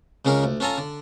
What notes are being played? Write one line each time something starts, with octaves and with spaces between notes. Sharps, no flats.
C#2 C#3 C#4 G#4 A#4
D2
C#4 F4 A4 G#5 A#5
D3